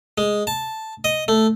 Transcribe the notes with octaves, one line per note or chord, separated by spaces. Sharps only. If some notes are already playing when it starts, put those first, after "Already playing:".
G#3
A5
D#5
A3